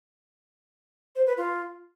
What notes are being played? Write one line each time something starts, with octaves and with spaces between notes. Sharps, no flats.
C5
B4
F4